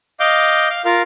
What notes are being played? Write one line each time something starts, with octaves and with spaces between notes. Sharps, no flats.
D#5 F5 D6 G6
F5
F4 A#4 F5